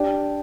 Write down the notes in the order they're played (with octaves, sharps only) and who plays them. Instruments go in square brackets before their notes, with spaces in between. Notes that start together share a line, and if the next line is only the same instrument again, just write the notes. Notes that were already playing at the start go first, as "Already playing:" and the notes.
Already playing: [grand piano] D4 G4